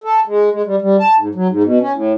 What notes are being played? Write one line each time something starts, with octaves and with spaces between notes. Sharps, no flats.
A4
G#3
G#3
G3
G3
A5
G#2
F#3
G#2
B2
C#4
A2